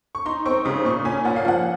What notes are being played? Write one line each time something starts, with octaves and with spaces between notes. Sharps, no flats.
C#6
D#4 C6
C4 C#6
C#3 D#6
A#2 C#6
C#4 G#5
A#2 F#5
F5
F3 F#5